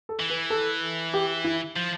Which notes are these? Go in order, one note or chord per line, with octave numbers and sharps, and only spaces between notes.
A4
E3
B4
A4
G4
E4
F3